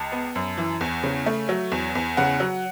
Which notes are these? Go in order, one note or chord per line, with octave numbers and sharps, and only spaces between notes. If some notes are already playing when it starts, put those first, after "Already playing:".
Already playing: C#2 A5
B3
F#2
E3
E2
C#3
A3
F#3
E2
E2
C#3 F#5
F#3